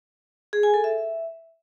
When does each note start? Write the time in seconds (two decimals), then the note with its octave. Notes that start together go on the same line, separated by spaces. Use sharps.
0.53 G#4
0.63 G#5
0.74 A4
0.84 E5